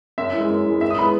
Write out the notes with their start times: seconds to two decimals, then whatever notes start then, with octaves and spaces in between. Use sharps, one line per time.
0.18 F#2 E5
0.33 E3
0.38 G#3
0.50 F#2
0.66 E3 G#3
0.81 F#2 E5
0.90 D#6
0.98 E3 G#3 B3 B5